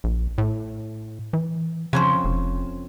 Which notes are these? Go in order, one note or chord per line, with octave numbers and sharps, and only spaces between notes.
A#1
A2
E3
F2 C#3 C#4 C5
F1